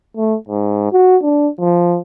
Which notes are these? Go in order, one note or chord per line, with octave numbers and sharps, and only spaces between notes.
A3
G#2
F#4
D4
F3